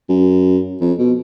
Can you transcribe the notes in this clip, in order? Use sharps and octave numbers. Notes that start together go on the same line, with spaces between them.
F#2
F2
B2